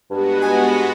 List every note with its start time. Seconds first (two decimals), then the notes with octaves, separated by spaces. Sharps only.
0.11 G2 G#3 B3 F#4
0.42 G#5